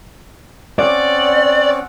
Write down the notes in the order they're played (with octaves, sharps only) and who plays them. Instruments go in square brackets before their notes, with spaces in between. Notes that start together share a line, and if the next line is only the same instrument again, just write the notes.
[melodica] C4 C#4 F#5 [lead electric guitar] D5